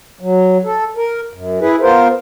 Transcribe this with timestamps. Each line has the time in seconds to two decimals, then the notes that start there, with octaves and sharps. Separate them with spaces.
0.21 F#3
0.65 A4
0.96 A#4
1.33 F#2
1.61 E4 G#4 B4
1.81 B3 F4 A#4 C5